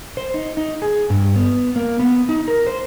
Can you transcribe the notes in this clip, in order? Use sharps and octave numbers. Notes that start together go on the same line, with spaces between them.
C5
D#4
D#4
G#4
G2
B3
A#3
B3
D#4
A#4
C5